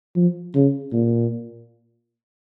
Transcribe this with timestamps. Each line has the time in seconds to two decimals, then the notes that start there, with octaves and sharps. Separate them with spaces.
0.15 F3
0.55 C#3
0.92 A#2